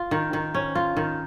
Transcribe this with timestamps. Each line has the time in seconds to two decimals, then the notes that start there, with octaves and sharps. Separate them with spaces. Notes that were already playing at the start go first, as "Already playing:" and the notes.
Already playing: F4
0.11 D#3
0.33 D#3
0.54 C#4
0.75 F4
0.97 D#3